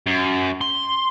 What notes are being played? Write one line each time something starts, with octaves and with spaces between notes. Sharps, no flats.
F#2
C6